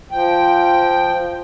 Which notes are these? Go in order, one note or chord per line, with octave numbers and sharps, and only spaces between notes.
F3 G5